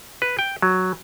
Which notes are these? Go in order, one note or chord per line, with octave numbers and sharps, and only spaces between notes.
B4
G5
F#3